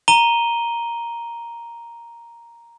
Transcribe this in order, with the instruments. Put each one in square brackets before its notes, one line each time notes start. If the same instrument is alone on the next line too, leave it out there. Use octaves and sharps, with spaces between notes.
[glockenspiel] A#5 D#7 G7